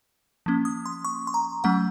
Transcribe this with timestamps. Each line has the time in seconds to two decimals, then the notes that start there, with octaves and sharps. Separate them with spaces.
0.46 F3 A#3 C#4
0.65 D#6
0.86 C6
1.05 C#6
1.27 C6
1.34 A#5
1.64 F#3 A3 C#4 F#5